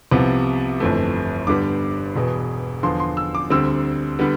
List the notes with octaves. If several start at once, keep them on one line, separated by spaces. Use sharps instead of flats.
C2 C3 F3 B3
G1 F2 E3 A3
G2 D3 G3 B3 D6
E1 E2 B2
E2 D3 F3 C6
C6
E6
D6
D2 D3 G3 C4 E6
D3 G3 B3